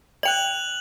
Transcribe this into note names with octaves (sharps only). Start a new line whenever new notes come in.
D5 G5 F#6 F7 F#7